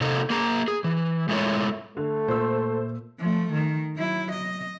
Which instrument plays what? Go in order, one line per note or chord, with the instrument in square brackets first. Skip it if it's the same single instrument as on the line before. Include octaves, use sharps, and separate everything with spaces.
[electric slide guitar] C3 A#3 D#4 A4
A#3 G#4 A#4 A#5
G#4
E3
G#3 A3 E4 F4 A#4 C#5
[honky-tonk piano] D3 [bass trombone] A3
[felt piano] A#2 [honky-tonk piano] C5 C6 E6
[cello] F3 A3
D#3
F#3 E4
D#5